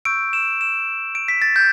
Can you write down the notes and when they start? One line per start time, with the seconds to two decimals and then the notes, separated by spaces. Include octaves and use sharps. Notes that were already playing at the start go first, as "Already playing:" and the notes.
0.05 C#6 E6 G6 D7
0.33 E7
0.61 E7
1.15 D7
1.28 B6
1.42 A6
1.56 G6